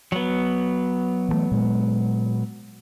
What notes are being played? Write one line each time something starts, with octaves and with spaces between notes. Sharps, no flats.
F#3 B3
E3 F3 A3
A#2 G#3